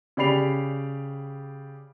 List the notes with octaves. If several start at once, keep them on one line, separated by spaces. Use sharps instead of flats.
C#3 G4 D5 B5 C7 F7